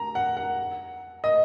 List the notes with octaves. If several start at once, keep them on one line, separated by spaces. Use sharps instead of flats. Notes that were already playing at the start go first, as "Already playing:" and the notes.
Already playing: A#5
F#5
F#5
D#5